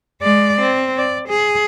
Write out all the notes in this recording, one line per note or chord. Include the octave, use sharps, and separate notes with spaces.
G#3 D5
C4
D5
G#4